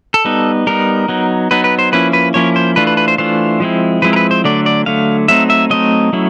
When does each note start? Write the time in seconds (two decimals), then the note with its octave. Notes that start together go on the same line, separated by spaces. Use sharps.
0.14 A4
0.25 G3 B3 D#4
0.67 G3 B3 D#4 A#4
1.08 F#3 B3 D#4
1.51 F#3 B3 D#4 B4
1.64 B4
1.79 C5
1.92 F3 A#3 C#4 E4 B4
2.13 B4
2.34 F3 A#3 C#4 E4 C#5
2.56 C5
2.76 E3 A3 D4 F4 B4
2.87 B4
2.97 B4
3.08 C5
3.18 E3 A3 D4 F4 C5
3.60 F3 G#3 C4 E4
4.02 F3 G#3 C4 E4 B4
4.13 A#4
4.16 B4
4.31 C5
4.44 D3 F#3 A3 D5
4.66 D5
4.86 D3 F#3 A3 F5
5.28 F#3 A3 C4 D#4 E5
5.50 E5
5.70 F#3 A3 C4 D#4 D#5
6.13 F#3 A3 C#4 E4